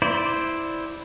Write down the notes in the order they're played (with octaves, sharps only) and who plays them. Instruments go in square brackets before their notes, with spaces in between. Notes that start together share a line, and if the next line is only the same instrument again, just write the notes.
[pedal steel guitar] E4 C5 D5